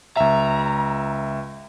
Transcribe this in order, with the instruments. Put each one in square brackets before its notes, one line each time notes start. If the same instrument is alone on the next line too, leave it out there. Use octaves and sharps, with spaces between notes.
[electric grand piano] C#2 E5 [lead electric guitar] A#5